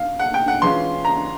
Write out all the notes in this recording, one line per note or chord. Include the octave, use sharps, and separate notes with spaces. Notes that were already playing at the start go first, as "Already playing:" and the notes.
Already playing: F5
F#5
G5
F#5
E3 G#3 C#4 F4 C6
A#5